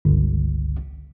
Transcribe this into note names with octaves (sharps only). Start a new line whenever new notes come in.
G1 C#2